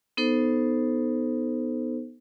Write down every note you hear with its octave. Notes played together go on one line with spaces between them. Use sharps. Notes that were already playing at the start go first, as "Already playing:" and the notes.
B3 D#4 A4 C5